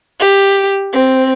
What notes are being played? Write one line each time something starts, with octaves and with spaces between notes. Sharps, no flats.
G4
C4